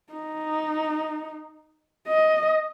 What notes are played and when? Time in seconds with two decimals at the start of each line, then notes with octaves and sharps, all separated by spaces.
0.13 D#4
2.08 D#5